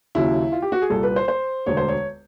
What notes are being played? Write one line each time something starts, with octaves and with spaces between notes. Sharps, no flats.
D#2 C#3 F#3 E4
F4
G4
F#4
G#4
C2 A#2 G3 A4
B4
C5
C5
E1 D2 D3 C#5
C5
C#5